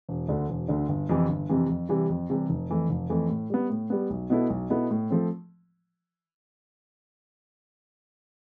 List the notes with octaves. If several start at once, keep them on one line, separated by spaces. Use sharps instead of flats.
E1
D2 D3
E1
D2 D3
G1
F2 C3 E3
G1
F2 C3 E3
F2
C3 E3 G3
F2
C3 E3 G3
F1
F2 E3 A3
F1
F2 E3 A3
A2
G3 B3
A2
G3 B3
B1
B2 B3 E4 A4
B1
B2 B3 E4 A4
A2
F3 A3 C4